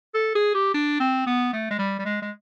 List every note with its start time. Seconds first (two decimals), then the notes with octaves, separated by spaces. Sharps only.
0.14 A4
0.35 G#4
0.54 G4
0.74 D4
1.00 C4
1.26 B3
1.53 A3
1.70 G#3
1.79 G3
1.99 G3
2.05 G#3
2.22 G#3